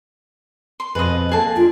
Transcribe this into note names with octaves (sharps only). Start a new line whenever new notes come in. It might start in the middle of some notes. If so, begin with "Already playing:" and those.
C6
F2 B2 G#4 B4 D#5
A#3 G#4 A4 G#5 A5
D4 F4